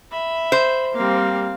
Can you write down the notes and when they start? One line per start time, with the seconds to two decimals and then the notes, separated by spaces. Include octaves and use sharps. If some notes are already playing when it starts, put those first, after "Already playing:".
0.11 E5 B5
0.52 C5
0.95 G3 A#3 C4 F5